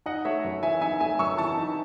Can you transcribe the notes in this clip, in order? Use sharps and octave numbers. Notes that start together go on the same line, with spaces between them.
D#4 D#5 F#5
A3 C#5 E5
F#2
E3 E5 G#5
D#4 E5 G#5
A3 E5 G#5
F#2 C#6 E6
E3 A5 C#6
D#4